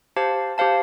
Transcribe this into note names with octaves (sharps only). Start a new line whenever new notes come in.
G4 C5 F5 A5
G4 C5 F5 A5